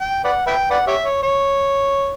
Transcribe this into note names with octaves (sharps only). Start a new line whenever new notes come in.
G5
B4 D5 F#5
B4 E5 G5
B4 D5 F#5
G4 C#5 E5
C#5
C#5